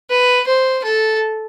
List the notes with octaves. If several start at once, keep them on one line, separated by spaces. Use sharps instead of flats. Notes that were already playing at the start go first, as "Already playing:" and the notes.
B4
C5
A4